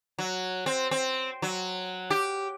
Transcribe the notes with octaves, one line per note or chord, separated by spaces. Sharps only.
F#3
C4
C4
F#3
G4